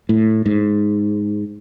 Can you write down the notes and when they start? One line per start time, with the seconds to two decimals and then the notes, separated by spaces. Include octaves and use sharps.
0.09 A2
0.46 G#2